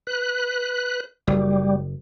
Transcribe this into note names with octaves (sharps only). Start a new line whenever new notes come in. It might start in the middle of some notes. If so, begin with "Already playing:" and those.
B4 F#6
F#1 G3